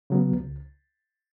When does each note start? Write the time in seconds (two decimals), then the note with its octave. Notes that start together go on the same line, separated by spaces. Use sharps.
0.10 C#3 F#3 B3
0.33 C#2